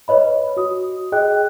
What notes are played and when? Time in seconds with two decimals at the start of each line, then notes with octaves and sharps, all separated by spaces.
0.08 B4 C#5 D#5 B5
0.57 F#4 D#6
1.12 G#4 D#5 G5 F#6